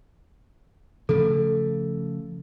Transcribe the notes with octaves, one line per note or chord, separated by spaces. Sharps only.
C#3 F3 A3 A4